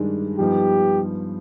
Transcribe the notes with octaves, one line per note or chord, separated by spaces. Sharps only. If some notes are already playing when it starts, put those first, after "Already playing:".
Already playing: G2 D#3 G#3 D4
G2 F3 B3 D#4 G4